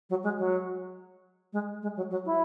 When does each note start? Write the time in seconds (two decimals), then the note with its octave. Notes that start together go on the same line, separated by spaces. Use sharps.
0.09 F#3
0.23 G#3
0.38 F#3
1.52 G#3
1.82 G#3
1.96 F#3
2.10 F#3
2.25 E4